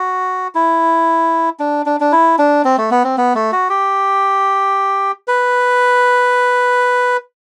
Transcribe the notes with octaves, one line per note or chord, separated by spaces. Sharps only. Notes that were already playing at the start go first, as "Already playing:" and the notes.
Already playing: F#4
E4
D4
D4
D4
E4
D4
C4
A3
B3
C4
B3
A3
F#4
G4
B4